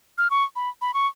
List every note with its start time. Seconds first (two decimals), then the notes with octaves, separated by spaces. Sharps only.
0.18 F6
0.30 C#6
0.56 B5
0.81 B5
0.94 C#6